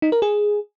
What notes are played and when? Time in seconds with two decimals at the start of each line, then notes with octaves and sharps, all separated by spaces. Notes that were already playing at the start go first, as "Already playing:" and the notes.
0.02 D#4
0.12 A#4
0.22 G#4